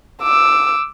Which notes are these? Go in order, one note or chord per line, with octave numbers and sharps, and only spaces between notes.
D6 E6